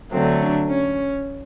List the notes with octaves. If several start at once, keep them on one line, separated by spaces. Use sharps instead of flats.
D3 F#3 A3 C4
D4
C#4